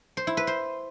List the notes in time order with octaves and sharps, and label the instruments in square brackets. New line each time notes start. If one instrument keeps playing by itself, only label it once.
[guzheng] C5
E4
B4
C5